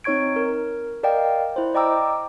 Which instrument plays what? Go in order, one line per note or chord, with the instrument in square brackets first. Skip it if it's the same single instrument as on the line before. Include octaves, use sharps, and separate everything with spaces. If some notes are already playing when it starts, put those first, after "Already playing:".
[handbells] C4 D#4 C#5 C#6 G#6 D7
A#4
A#4 D5 D#5 F5 G5
E4 C5
D5 D#5 G5 A#5 D6 E6